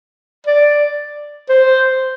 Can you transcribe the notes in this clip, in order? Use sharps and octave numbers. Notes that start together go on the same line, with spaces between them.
D5
C5